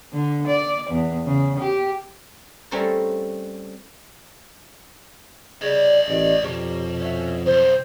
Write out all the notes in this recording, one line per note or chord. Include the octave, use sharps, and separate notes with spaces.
D3
D5
E2
C#3
G4
G3 A3 C4 C#4 A#4 D5
C#3 G3 C#5 D#5
A1 D#3 F3 D5
F2 B2 G4 A#4 C#5
C#4 F#4 E5
B1 F#2 C4 C5